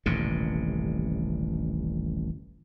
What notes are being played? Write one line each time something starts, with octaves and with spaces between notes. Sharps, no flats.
D#1 A1 G2 C3